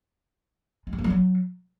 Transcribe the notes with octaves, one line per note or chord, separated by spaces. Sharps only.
G#3
C4
A#3
G3
F#3